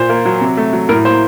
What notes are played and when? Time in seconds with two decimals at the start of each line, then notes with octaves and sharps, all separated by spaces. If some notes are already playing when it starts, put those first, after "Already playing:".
Already playing: A#2 C5
0.09 A#3
0.25 F#3
0.41 C3
0.57 A3
0.73 F#3
0.89 A2 A#4
1.05 A#3 C5